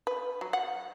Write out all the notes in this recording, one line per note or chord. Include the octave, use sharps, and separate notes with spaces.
B4
F#3
F#5